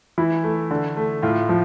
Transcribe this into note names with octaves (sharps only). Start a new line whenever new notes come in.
E3 E4
A3
D3
A3
A2 F4
F3